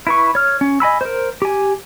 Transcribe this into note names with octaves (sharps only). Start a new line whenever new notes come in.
E4 B4 C#6
C#5 F6
C#4
D#5 G#5 B5 E6
A#4 C5
G4 G#5